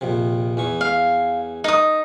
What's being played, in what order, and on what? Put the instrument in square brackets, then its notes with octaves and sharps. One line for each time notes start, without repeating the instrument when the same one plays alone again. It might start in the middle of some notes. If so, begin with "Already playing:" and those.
[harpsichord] A#1 F2 C3
E2 E3 C#6
[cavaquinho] F5
[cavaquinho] D#4 D#6 [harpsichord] A#4